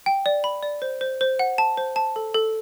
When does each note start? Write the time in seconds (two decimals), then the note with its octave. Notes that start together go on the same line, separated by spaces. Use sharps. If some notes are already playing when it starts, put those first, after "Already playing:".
0.06 G5
0.26 D5
0.44 B5
0.63 D5
0.82 C5
1.01 C5
1.21 C5
1.39 F#5
1.58 A5
1.77 C5
1.96 A5
2.16 A4
2.34 A4